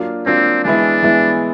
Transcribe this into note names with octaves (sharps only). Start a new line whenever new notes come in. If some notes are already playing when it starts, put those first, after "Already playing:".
Already playing: F#3 A#3 D4 F4
F#3 A#3 C4 D4 F4
E3 G#3 B3 D4 E4
E3 G#3 B3 E4